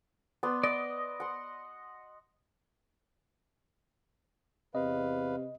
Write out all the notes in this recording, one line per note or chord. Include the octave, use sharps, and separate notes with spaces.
B3 D5 C6
D5 D#5
F#5 C6
E2 C3 B4 D#5 F5